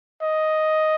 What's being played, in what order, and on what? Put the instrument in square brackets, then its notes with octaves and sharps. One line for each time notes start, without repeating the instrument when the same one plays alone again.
[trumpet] D#5